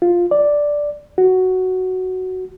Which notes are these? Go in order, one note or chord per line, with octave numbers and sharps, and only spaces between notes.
F4
D5
F#4